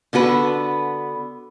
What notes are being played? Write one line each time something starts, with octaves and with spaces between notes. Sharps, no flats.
D3 B3 F#4 B4